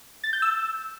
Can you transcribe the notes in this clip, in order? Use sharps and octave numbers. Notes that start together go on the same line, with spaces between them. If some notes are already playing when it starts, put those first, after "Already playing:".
A6
G6
E6